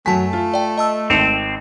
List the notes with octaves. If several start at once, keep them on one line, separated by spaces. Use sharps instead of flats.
F#2 F#3 A3 G#5 A5 B6
F4
D5 G5
D#5 A5 E6
G#1 C4 C#7 F7